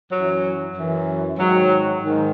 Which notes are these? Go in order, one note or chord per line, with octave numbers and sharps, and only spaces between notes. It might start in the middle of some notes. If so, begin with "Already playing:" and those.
F#2 E3 F#3
F#2 E3
G#2 D#3 F#3
G#2 D#3